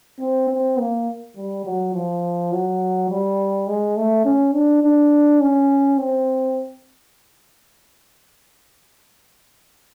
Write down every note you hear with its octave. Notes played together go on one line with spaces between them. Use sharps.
C4
C4
A#3
G3
F#3
F3
F#3
G3
G#3
A3
C#4
D4
D4
C#4
C4